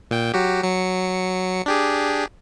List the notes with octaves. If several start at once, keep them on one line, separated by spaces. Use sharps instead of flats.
A#2 G5
F#3 F#4 G4
F#3 C#7
D4 G4 G#4